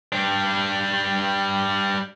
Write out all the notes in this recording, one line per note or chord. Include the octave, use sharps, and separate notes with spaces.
G3 D4